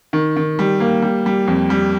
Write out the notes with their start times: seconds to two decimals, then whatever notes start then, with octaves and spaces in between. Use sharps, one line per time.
0.13 D#3
0.36 D#3
0.59 G3
0.80 A#3
1.02 G3
1.26 G3
1.48 F2
1.70 G3